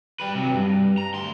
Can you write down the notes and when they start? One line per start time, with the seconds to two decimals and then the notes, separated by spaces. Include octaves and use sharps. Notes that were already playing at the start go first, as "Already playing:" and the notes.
0.20 G3 B4
0.35 C3 F#3
0.54 G2
0.98 A#5
1.14 D2 C6